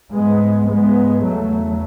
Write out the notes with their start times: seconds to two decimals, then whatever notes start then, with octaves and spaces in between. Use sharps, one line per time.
0.14 G#2 G#3 B3
0.69 G#3 B3
1.23 E2 C#3 F#3 A3